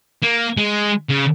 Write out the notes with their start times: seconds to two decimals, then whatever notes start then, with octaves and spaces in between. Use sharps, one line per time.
0.23 A#3
0.57 G#3
1.10 C#3